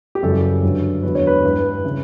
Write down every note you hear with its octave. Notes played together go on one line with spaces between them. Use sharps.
G4
F#2 C#3 E3 G3 A4
G2 D3 F#3
E2 D3 F#3 B4
C#5
B4
G2 E3 G3
C#3 E3